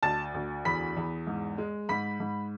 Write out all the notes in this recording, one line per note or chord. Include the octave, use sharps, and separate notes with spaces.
D2 A5 A6
D2
E2 B5 B6
E2
G#2
G#3
G#2 B5 B6
G#2